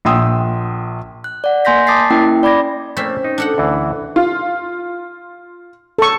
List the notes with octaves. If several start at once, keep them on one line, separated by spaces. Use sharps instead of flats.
A#1 F#5 G5 C6 D#6 E6
F#6
D5 F#5
A#3 G#5 C6 G6 A#6 B6
A5 D6 D#6 A6 B6 C7
A#3 C#4 E4 G5
D5 B5 D6 G#6 A#6
A3 A#3 C4 C#4 E5
D#4
D4 A4 F#5
D2 E3
F4
A4 C#6